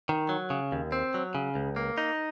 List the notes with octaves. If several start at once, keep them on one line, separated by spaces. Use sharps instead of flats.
D#3
F#3
C#3
D#2
C4
F#3
C#3
C#2
A#3
D#4